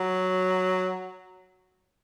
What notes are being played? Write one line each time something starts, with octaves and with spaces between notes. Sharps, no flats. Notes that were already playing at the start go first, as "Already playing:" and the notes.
Already playing: F#3